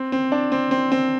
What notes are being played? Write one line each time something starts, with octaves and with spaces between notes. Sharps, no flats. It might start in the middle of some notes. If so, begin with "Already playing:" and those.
Already playing: C4
C4
D4
C4
C4
C4